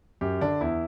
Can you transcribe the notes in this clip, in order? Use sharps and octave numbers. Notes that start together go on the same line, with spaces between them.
F#2 G4
D3 D4
E2 E4